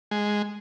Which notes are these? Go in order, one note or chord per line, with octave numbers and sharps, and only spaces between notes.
G#3